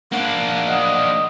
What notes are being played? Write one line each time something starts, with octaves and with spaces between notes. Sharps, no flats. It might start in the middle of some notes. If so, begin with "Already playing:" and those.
A#3 D4 F#5
D#5